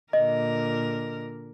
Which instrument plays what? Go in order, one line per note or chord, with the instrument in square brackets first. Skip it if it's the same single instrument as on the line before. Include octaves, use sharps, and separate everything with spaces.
[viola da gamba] A#2 D3 A#4 [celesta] D#5